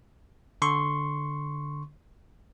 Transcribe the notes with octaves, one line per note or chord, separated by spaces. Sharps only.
D3 C6 C#6